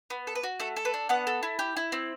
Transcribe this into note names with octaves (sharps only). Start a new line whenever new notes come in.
B3
A4
B4
F#4
A3 A4
A4
B4
D4
B3 F#5
A4
E4
G4
E4
C4